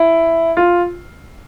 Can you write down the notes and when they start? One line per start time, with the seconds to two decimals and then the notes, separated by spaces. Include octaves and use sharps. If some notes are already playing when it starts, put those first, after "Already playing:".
Already playing: E4
0.57 F4